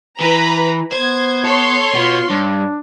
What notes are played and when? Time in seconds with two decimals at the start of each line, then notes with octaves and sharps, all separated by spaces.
0.21 E3 B4 A#5 B5
0.92 B3 C5 G#6
1.45 A4 C#5 C6
1.93 B2 B3 F4
2.30 G2 D4